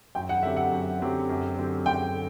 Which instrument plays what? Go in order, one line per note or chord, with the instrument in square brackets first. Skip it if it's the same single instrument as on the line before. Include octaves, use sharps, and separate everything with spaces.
[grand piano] F#2 [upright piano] G5
[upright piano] F#5
[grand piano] D3 F#3 C4 G4 [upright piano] E5
[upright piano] F#5
[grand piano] F#2
D3 F#3 C4 G4
F#2
D3 F#3 C4 G4
[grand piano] F#2 [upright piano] G5
[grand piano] D3